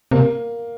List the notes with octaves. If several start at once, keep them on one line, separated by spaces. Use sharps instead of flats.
C3 A#3